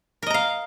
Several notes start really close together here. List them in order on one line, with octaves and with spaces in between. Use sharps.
A#4 D#5 A#5 F5